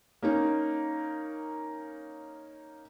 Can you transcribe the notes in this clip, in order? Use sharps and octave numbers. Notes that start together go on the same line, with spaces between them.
A#3 C#4 D#4